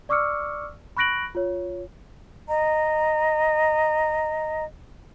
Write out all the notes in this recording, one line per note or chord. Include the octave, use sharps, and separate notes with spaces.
D5 C#6 D6 E6 F6 C#7
B5 C#6 F#6 A#6 D7 F#7
F4 C#5
D#5 A#5